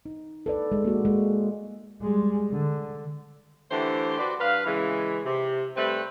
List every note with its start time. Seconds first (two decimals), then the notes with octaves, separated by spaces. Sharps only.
0.06 D#4
0.46 A4 B4 D5
0.72 G#3
0.85 A#3 F#4
1.05 G#3
2.02 G3 G#3
2.53 D3
3.70 D3 E3 A3 G4 C5
4.18 F#4 B4 C5 D5
4.40 G2 B4 F5
4.65 C#3 E3 G#3
5.24 C3
5.76 G3 A3 C4 B4